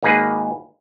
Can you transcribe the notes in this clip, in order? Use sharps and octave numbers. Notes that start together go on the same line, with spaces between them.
G#1 A#3 D#4 G#4 B4